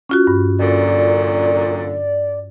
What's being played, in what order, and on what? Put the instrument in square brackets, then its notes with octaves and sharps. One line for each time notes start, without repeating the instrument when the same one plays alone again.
[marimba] C#4 F4 F#4
G2
[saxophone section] F#2 A#2 D3 [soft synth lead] D5